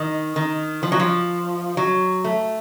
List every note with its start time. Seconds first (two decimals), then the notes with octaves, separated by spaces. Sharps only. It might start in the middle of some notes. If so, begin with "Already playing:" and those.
Already playing: D#3
0.36 D#3
0.83 F3
0.92 F#3
1.00 F3
1.77 F#3
2.24 A3